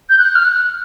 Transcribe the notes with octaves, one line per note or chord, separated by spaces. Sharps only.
G6
F#6
F6
F#6